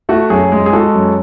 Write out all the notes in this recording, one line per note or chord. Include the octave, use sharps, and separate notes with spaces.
A3 F#4 A4
F#2 G#4
G#3
G#4
G#3 F#4 A4
F#2